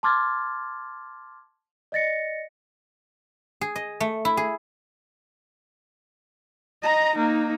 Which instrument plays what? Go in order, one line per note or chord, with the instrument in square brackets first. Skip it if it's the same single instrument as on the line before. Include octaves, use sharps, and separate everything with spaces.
[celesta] A5 C6 D6 F6 G#6 A6
D5 D#5 A6 A#6 C#7
[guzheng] G#4
D#5
A3
E4
G#4
[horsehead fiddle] D#5 A#5
A#3 D#4